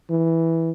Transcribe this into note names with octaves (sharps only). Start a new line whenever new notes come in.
E3